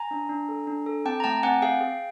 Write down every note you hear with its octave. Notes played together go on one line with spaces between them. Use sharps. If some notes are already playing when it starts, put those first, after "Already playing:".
Already playing: G#5 A#5
D4
D4
A4
D4
A4
C4 G5 A5
A#5
A3 G5 A5
C4 F#5 G#5
G#4 F5 G5
G#4